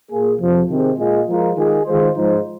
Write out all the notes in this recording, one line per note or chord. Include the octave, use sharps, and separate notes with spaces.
A#2 A#3 G#4
F2 C3 F3
C3 D#3 C4 G#4
A#2 G#3 F4 G#4 D#5
F3 G#3 F4 A#4
D#3 G#3 F4 G#4
D#3 G#3 F4 G#4 C5
G#2 F3 G#3 D#4 C5